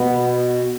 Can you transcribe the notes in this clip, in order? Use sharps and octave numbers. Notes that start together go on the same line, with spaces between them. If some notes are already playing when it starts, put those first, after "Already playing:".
Already playing: B2 B3